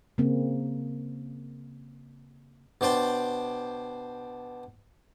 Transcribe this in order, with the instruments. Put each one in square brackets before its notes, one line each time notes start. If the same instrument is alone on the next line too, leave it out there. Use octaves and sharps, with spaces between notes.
[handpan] C#3 A#3 C4
[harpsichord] B2 D4 C5 D5 G5